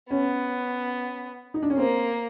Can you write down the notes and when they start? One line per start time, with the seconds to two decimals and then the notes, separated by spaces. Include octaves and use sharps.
0.11 B3 C#4
1.54 D#4
1.63 D4
1.70 C#4
1.78 A#3 C4